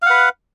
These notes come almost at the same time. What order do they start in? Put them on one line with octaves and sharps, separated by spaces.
F5 F#5 B4